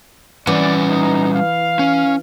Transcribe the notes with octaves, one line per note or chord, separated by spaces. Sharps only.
E3 G3 C#4 D5 F#5
D#4
F5
C#4